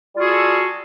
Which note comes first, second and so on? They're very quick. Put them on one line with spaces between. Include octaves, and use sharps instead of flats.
G3 F4 F#4 G#4 A4